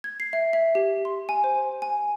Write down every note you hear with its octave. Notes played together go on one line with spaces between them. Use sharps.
G#6
C7
E5
E5
G4
C6
G#5
C5
G#5